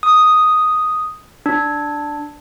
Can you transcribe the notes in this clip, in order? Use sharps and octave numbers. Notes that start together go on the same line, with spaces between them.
D#6
D4